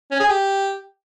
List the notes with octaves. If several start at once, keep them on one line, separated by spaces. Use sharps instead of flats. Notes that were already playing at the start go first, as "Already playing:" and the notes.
C#4
G#4
G4